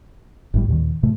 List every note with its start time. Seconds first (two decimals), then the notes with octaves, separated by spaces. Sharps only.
0.54 G1 A2 G3
0.69 D#2 A#2 D#3
1.03 A2 C3 A3